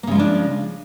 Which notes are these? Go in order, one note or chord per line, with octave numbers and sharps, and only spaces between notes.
C#3 F3 G#3 A#3 D4